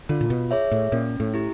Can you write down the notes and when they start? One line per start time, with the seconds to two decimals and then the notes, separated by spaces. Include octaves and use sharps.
0.09 D3 F4
0.21 A#2
0.30 B2
0.51 G#4 C#5 E5
0.71 A2
0.92 A#2 C#4
1.20 A2
1.34 E4 G4